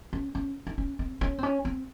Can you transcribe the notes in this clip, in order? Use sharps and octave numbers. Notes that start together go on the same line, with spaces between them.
C#4
C#4
D#4
C#4
C4
C#4
C4
C#4
C4